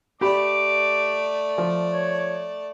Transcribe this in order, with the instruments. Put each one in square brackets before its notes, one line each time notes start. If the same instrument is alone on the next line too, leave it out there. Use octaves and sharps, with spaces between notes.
[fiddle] A3 D5 [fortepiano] G4 B5 [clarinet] D6
[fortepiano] F3
[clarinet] C#5